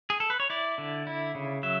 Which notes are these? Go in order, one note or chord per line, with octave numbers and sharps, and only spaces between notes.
G#4
A4
B4
C#5
E4 D5
D3
E4
C#3
F#3 E5